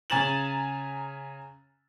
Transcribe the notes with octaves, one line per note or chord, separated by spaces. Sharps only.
C#3 G#5 A#5 A6 E7 F#7